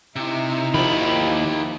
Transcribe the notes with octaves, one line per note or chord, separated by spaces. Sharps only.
C3 D#4 E4
D#2 D#3 F3 G4 A#4 B5